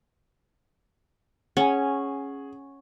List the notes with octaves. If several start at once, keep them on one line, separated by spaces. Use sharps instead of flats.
C#4 G#4 F#5 G#5